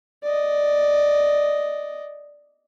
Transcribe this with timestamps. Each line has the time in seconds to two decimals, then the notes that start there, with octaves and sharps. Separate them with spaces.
0.23 D5 D#5